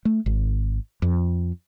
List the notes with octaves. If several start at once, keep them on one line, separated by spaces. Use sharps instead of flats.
A3
G#1
F2